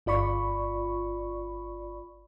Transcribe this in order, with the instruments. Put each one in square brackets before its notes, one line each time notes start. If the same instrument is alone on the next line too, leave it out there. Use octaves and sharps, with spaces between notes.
[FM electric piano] G1 F4 D5 B5 C#6